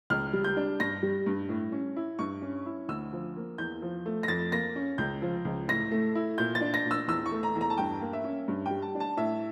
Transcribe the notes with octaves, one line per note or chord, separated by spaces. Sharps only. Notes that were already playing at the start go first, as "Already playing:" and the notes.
C#2 F6
G3
G6
D4
G2 A#6
G3
G2
A2
C#4
E4
G2 C#6
C#4
E4
D2 E6
F3
A#3
E2 G6
F3
A3
A#6
F2 A6
A#3 A#6
C#4
C#2 G6
F3
C#2
A2 A#6
A3
E4
A#2 G6
A6
D4
A#6
A#2
E6
E2 E6
C#6
A3
A#5
E2
A#5
A5
G2 G5
A#3
E5
C#4
G2
G3 G5
A5
D4
A5
A2 E5